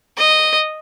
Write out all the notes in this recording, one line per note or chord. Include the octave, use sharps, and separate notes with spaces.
D#5